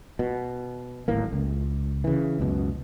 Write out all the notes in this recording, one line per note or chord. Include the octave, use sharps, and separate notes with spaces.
B2
D1 G#1 A2 A#3
C#2
C#3 E3
C#2 F#2 B2